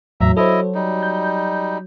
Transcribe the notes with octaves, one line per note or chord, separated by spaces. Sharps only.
E2 A2 F#3 E5 A#5
E4 A4 C5 D#5
G3 D#4
G6